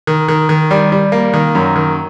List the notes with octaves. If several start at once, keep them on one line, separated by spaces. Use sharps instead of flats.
D#3
D#3
D#3
G3
G3
A#3
D#3
F#2
D#3